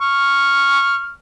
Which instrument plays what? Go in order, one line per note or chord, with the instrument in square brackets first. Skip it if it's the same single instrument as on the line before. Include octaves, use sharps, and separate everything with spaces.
[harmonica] C#6 F6